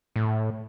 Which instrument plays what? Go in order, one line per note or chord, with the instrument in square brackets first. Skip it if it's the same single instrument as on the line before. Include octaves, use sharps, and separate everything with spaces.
[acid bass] A2